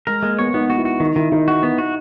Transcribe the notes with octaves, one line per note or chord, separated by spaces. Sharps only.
G#3 A#4
G#3 A#3
B3 C#5
B3 D#4
F#4
E4
F#4
D#3 D#4
D#3 E4
D#3 D#4
F#4
B3
F#4